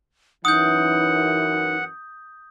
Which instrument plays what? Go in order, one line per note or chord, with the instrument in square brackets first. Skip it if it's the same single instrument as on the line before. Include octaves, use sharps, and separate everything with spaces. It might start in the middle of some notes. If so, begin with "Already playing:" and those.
[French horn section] F#2 E3 [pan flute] D#4 [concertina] F#5 [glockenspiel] D#6 G6